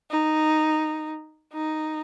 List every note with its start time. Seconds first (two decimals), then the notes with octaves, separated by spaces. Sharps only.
0.11 D#4
1.53 D#4